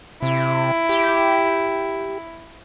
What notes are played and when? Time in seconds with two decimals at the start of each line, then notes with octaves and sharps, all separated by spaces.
0.22 C3 E4
0.89 G4